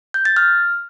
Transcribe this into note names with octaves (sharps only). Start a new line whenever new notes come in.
G6
A6
F6